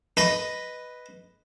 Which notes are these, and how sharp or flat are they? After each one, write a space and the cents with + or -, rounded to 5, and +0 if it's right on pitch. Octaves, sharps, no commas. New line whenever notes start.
B4 +0 D#5 +0 B5 +0